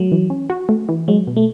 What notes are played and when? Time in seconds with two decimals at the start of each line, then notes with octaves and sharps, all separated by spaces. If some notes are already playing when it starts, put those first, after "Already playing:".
Already playing: F#3 A3
0.12 E3
0.30 C#4
0.50 F#4
0.69 A3
0.89 E3
1.08 F#3 G#3
1.27 B2
1.36 A3